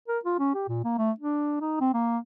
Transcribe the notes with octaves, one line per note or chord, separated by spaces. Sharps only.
A#4
F4
C#4
G4
A#2
A#3
A3
D4
D#4
C4
A#3